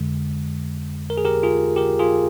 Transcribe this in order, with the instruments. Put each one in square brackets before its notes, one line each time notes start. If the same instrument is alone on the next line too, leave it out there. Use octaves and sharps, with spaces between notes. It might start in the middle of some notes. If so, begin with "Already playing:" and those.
Already playing: [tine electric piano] F2 D3 G#3
A#4
G#4
G4 A#4
F4 G#4
G4 A#4
F4 G#4